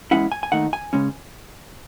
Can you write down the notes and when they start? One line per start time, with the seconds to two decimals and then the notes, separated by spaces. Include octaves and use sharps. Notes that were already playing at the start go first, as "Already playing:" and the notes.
0.11 E2 C#3 G#3 C#4 E4 F#5
0.32 G#5
0.43 G#5
0.52 D#2 D#3 A3 D#4 F#5
0.73 G#5
0.93 C#3 G#3 C#4